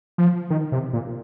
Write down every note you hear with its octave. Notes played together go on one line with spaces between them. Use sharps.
F3
D#3
C3
A#2